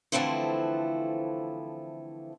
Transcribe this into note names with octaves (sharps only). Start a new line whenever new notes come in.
D3 E3 F3 A3 C4 E4